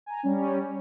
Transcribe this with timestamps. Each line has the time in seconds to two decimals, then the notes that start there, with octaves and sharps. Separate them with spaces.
0.06 G#5 A#5
0.23 G3 C#4